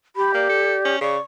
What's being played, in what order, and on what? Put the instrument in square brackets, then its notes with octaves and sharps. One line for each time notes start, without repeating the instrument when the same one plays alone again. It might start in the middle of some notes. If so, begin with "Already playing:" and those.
[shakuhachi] G4 [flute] B5
[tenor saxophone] A#3 [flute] D5
[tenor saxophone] A4
C#4
[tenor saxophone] C#3 [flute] D5 [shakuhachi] C#6